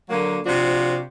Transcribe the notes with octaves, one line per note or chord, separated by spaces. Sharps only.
D3 F#3 A#3
C3 F3 D4 F4 F#4